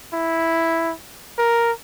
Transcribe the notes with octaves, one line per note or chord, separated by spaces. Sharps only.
E4
A#4